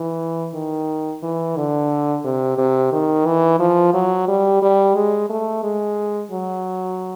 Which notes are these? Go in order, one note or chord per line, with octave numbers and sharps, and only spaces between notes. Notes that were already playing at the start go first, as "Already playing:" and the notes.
Already playing: E3
D#3
E3
D3
C3
C3
D#3
E3
F3
F#3
G3
G3
G#3
A3
G#3
F#3